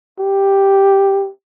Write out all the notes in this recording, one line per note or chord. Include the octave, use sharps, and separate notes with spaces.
G4